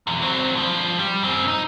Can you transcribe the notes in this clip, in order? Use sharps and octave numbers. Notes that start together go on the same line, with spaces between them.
B1 E2
F#3 C4
G2 F3
G3
F#2 C4
D#4